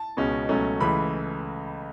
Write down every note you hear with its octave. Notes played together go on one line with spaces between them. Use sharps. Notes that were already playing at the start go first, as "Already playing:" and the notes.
Already playing: A5
C#2 B2 G#3 C#4
C#2 B2 F#3 A3 C#4
C#2 C#3 E3 A3 B5